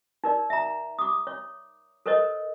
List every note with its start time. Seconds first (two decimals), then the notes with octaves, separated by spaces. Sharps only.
0.24 D#4 A#4 D5
0.50 E5 A#5
0.99 D6 D#6
1.27 C#5
2.06 A4 A#4 C5 C#5 D#5